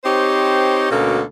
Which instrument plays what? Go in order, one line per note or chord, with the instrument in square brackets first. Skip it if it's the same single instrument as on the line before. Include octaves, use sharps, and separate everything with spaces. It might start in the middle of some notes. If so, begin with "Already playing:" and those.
[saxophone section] C4 D#4 G4 C5 C#5
D2 B2 A#3 C#4 A4